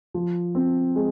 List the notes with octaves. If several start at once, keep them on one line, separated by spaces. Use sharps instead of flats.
F3
C4
G#3